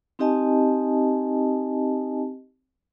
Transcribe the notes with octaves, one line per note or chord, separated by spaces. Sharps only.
C4 D#4 G4 D#5 G#5 A5